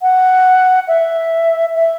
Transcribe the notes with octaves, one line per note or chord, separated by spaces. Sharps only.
F#5
E5
E5